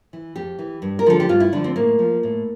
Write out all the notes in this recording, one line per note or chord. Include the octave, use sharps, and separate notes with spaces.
E3
F2 G4
E3
G2
A#4
D3 F3 A4
G4
G2 F4
E4
D3 F3 D4
C4
A2 A#3
F3
A2